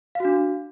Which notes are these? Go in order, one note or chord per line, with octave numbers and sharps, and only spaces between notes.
D4 F#4 F5